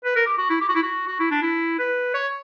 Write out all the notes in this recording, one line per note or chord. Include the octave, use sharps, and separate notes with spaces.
B4
A#4
G4
F#4
E4
G4
F#4
E4
F#4
F#4
E4
D4
E4
B4
C#5